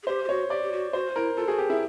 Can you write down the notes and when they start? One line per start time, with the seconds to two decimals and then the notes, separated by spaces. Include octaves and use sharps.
0.03 G#4
0.07 G4 C5
0.24 G4
0.29 F#4 C#5
0.50 G4 D5
0.62 G4
0.72 F#4
0.93 F#4 C5
1.15 E4 A#4
1.36 F4 A4
1.48 F#4 G#4
1.58 G4
1.70 E4 G#4